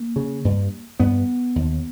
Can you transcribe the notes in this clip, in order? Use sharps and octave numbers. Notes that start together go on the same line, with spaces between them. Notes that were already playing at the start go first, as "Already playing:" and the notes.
Already playing: A#3
C#3
G2
G2 B3
D#2